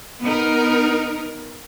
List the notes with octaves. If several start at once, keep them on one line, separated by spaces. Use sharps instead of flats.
B3 D#4 A#4